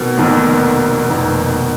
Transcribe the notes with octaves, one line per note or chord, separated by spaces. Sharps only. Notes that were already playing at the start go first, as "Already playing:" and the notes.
Already playing: F1 F2 B2 D#3 A#3
F1 F2 D#3 A#3
F1 F2 D#3 A#3